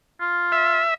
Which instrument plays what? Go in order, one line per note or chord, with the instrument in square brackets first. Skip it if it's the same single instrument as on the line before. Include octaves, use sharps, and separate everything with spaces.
[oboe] F4
[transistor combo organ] E5